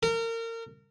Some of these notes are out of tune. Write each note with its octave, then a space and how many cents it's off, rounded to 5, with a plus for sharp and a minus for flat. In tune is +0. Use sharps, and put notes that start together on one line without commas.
A#4 -30